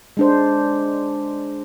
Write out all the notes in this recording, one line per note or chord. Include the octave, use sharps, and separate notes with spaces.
G#3 D4 C5